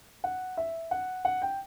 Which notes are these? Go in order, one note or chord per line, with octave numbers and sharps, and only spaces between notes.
F#5
E5
F#5
F#5
G5